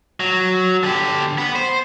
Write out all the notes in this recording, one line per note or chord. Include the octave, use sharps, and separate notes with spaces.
F#3
D3 G4
B3
C5